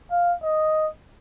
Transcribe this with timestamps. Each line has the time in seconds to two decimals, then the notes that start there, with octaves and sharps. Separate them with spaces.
0.11 F5
0.43 D#5